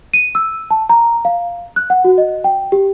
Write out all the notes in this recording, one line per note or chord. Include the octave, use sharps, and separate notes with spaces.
D#7
E6
A5
A#5
F5
F#6
F#5
F#4
D#5
G5
G4